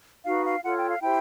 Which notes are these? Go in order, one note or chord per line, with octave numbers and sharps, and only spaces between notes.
D#4 F#4 B4 F5
F5
F4 A4 C#5 F#5
G5
F5
E4 G4 C5 G5